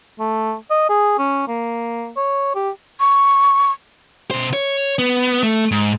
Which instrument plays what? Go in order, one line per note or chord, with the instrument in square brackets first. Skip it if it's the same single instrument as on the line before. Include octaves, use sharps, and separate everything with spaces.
[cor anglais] A3
D#5
G#4
C#4
A#3
C#5
G4
[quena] C#6
[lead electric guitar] B2 C5
C#5
B3
A3
G#2